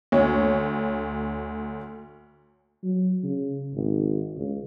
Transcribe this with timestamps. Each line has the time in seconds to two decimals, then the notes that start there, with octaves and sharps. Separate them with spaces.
0.12 D2 C#5
2.83 F#3
3.23 C#3
3.74 G#1
4.37 C#2